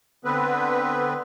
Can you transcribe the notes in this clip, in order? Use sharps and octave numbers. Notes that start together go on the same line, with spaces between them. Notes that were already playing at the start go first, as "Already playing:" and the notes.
D3 B3 C4 B4